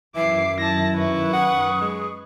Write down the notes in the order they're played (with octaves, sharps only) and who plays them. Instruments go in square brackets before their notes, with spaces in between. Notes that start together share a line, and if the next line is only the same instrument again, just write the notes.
[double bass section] F#2 D#3 [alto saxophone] E3 [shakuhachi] E5 [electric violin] D6 C7
[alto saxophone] E4 [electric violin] A5 A#6
[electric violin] B4 C#6
[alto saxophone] F#5 [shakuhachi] D#6
[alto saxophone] G#3